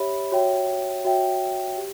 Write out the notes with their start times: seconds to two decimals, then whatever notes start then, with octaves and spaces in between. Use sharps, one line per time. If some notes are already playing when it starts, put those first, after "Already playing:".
Already playing: G4 C#5 E5 B5
0.32 F#4 C#5 E5 G5
1.05 F#4 C#5 E5 G5
1.77 G4